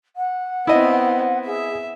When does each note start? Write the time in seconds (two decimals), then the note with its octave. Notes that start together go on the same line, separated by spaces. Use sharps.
0.16 F#5
0.67 B3 C4 E4 D#5
1.46 G#4 E5